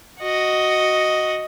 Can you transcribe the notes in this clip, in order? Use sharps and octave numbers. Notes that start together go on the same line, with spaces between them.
F#4 D#5